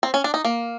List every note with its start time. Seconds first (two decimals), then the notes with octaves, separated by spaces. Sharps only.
0.03 C4
0.14 C#4
0.24 D4
0.34 D#4
0.45 A#3